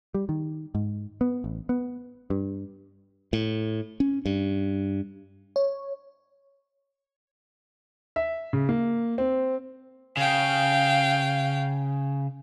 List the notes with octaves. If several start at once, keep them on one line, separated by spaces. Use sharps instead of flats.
G3
D#3
G#2
B3
A1
B3
G2
A2
C#4
G2
C#5
E5
C#3
A#3
C4
C#3 F5 G5